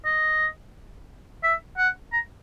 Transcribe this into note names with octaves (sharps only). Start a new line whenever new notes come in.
D#5
E5
F#5
A#5